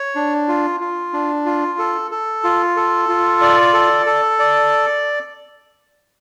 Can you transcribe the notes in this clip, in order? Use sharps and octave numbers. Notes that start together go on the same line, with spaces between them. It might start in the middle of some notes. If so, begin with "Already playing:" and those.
Already playing: C#5
D4
F4
F4
D4
F4
A4
A4
F4
A4
F4
D5
A4
A4
D5